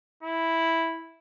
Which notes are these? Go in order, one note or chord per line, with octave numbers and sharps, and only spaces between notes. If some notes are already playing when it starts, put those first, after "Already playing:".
E4